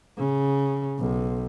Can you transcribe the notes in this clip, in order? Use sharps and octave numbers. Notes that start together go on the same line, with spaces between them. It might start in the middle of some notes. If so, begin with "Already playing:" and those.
C#3
B1